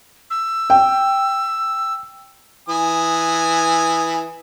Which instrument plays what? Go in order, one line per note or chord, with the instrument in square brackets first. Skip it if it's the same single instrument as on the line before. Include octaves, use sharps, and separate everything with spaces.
[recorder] E6
[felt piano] G5
[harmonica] E3 G#5 D#6